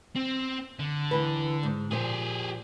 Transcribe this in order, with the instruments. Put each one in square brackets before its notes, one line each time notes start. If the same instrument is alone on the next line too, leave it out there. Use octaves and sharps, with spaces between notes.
[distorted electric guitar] C4
D3
[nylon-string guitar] D#2 E3 B4
G#2
[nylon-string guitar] A#2 F3 C5 [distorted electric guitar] G4 G#4